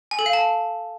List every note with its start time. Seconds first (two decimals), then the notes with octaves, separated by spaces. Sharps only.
0.11 G#5
0.19 A4
0.26 F5
0.33 A5